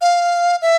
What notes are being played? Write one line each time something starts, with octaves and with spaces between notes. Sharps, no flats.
F5
E5